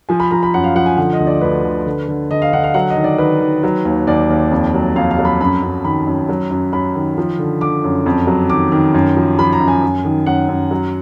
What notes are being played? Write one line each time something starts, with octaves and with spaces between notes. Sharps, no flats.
F3 G#5
B5
F3 A#5
B5
F#2 F#5
F5
F3 F#5
G#5
D3 F#5
D#5
D2
D5
D2 B4
D3
D3
D3
D3 D#5
F5
D3 F#5
F5
F#3 F#5
D#5
D#3
D5
D#3 B4
D#3
F#3
D#2
D#2 D5
D#2
F2
F#3
F2 F5
F5
F#3
B5
F#2 B5
F#2
D#3 B5
F#2
F#3
F#2
F#2 B5
D#3
F3
D3
D3 D6
F#2
F2
F#3
D#3 D6
D#3
F#2
F3
F3 B5
A#5
F#2
G#5
F#2
D#3
F#2 F#5
F#2
F#3